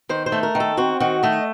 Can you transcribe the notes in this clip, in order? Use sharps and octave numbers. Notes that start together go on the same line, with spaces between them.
D#3 C5
C5
A3
A#4
D#3
A4
C4 F#4
D#3 F#4
A3 D#5